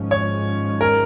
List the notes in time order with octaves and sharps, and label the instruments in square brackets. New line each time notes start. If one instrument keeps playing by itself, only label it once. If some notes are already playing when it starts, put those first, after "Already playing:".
Already playing: [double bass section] G#1 G#2 F3 G#3 C#4
[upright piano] C#5
A#4